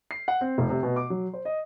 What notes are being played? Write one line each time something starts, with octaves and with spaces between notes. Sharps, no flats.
C7
F#5
C4
F1
C3
B2
D6
F#3
C5
D#5